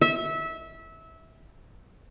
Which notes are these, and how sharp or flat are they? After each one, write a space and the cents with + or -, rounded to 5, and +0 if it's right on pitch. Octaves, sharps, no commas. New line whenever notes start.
E5 -20